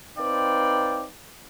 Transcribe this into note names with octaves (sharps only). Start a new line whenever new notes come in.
C4 D#4 B4 D5 F5 G5